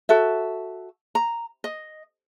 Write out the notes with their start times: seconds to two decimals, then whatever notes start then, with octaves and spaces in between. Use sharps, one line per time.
0.09 F#4 A4 E5
1.15 A#5
1.64 D#5